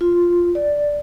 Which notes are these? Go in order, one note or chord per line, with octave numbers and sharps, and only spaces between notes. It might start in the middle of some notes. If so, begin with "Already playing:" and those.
F4
D5